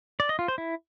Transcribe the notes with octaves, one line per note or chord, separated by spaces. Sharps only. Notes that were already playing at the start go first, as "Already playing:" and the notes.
D5
D#5
F4
C5
E4